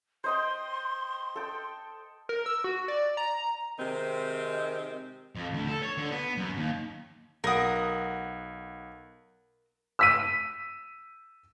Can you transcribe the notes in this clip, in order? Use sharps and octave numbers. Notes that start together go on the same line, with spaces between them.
C5 D#5 G5 C6
A4 G5
A#4
E6
F#4
D5
A#5
C3 D#3 G#3 C4
F2
D2
A4
C#5
D3
B3
F#2
D#2
B1 A#4 F#5 D#6
E6 B6 D#7